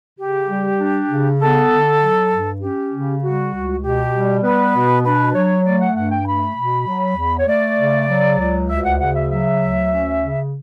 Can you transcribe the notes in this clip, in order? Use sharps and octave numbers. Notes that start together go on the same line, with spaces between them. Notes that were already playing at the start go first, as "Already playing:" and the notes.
C#3 G4
G3
D4
C#3
B3 A4
D3
F#3
G2
C#4 G4
C#3
G3 F#4
C#2
B2 G4
G3
B3 B4
B2
D4 B4
F#3 C#5
A3 D5
F#5
G2 F#5
G5
A3 B5
B2
F#3
E2
C#5
A3 D5
C#3
F#3
C#2
D2 E5
F#5
C#3 F#5
E5
F#3 E5
D2
C#4
C#3